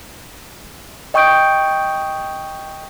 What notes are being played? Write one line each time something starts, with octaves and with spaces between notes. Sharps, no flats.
D#5 G5 C#6 D#6 G6 D7